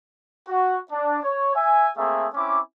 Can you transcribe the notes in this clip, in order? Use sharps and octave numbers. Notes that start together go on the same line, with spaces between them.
F#4
D4
C#5
E5 G#5
A3 A#3 C4 G#4 E5
C4 C#4 E4 D6